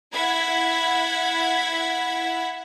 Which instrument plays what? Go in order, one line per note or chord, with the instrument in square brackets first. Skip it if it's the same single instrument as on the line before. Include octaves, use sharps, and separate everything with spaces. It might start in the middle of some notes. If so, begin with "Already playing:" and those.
[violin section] E4 F#5 B5 G#6